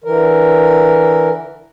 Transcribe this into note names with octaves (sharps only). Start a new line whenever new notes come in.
D3 E3 A#4